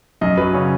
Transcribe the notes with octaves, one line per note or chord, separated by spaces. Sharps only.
F#2 D#5
F#3 B4
C#3 C#5